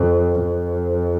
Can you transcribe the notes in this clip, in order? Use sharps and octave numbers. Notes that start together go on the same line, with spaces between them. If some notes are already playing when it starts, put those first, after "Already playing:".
Already playing: F2
F2